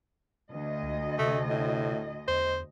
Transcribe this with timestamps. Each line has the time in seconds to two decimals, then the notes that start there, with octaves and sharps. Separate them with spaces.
0.51 D2 D#5
0.82 C#2
1.18 C3 A3
1.49 A2
2.28 E2 C5